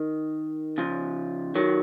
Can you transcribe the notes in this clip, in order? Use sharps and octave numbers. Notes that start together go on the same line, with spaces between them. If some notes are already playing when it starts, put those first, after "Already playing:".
Already playing: D#3
C#3 F3
D#3 F#3